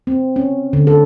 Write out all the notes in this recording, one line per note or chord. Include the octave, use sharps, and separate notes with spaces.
C4
C#4
D3
A4